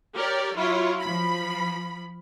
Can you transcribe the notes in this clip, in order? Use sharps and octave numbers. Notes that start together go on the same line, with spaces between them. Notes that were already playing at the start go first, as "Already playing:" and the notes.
G4 A#4 C#5 D5
F#3 E4 F4 C#5
F3 B5